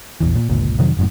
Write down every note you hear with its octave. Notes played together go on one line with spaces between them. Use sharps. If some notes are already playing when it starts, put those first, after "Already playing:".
A#1 E2 E3
A#2
G1 C#2 A#2
F2 C3 D#3 F#3
F#1 F#2 A2